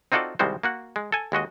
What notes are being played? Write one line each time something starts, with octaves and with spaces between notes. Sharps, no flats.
C4 D#4 F4 F#4 A4 D5
C2 D#3 G3 G#3 F#4 C5
A#3 F#4 F#5
G#3
A4 G#5
D#2 G#3 F#4 D#5